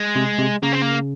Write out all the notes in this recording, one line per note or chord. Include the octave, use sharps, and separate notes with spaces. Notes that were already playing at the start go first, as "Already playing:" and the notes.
Already playing: G#3
C3
C3
C#3 A#3
C4
A#3